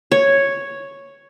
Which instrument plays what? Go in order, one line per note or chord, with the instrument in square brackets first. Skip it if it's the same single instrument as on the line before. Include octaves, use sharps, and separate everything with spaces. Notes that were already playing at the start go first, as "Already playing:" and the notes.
[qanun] C#5